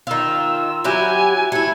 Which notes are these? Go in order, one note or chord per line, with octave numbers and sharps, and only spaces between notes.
D#3 F4 E6
F#3 E4 G4 G#5
A3 E4 G#6